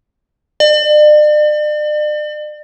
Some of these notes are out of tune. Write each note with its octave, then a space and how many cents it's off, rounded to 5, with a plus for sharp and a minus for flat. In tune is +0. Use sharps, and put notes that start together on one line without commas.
D5 +40